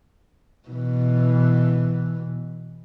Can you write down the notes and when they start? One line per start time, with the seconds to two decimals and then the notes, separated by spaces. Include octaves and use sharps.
0.68 B2 E3